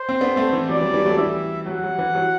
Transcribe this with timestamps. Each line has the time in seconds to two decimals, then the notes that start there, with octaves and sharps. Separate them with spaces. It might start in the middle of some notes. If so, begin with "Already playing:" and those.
Already playing: C5
0.09 C4
0.21 B3 D4
0.36 A3 C4
0.53 E3
0.69 F#3 D5
0.81 E3 G3
0.93 E3 G3
1.05 F#3 A3
1.18 E3 G3 E5
1.66 F#3 F#5
1.83 F#3
1.99 E3
2.15 F#3